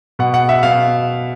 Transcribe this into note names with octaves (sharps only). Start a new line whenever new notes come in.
B2 F#5
F#5
E5
B2 F5